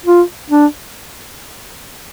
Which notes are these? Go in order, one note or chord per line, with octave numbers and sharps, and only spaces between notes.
F4
D4